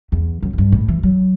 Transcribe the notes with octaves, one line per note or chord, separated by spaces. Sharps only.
E2
F#2
F#2
G2
A2
E3
F#3